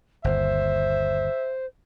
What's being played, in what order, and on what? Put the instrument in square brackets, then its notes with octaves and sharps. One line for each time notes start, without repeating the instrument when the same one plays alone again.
[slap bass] G1 D#2 [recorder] C5 [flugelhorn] E5